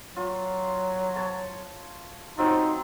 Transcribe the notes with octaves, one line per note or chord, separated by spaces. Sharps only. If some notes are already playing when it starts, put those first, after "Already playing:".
F#3 F4
C#5 A5
F#3 C4 D#4 F4